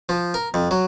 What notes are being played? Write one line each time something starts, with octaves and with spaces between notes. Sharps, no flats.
F3
A#4
F2
F#3